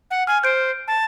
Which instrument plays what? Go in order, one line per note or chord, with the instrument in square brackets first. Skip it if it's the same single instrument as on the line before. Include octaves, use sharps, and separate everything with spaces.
[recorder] F#5
[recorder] G#5 [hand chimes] F6
[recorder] C5 [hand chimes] G6 D7
[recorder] A5